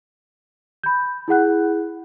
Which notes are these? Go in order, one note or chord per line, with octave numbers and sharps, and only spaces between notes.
B5 G6
E4 G#4 F#5 F#6